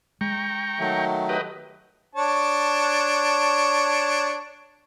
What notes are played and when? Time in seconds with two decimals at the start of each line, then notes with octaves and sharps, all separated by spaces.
0.21 G#3 G5 A#5 C#6
0.79 D#3 F#3 A3
1.29 G4 B4 D#5
2.15 D4 C#5 A5